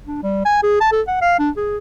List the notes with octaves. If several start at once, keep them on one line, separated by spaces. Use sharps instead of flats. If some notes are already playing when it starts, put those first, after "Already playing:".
D4
G3
G#5
G#4
A5
A4
F#5
F5
D4
G#4